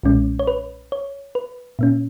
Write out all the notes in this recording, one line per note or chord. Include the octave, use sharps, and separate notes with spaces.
B1 A#2 G#3 C#4
C#5
B4
C#5
B4
A#2 A#3 C#4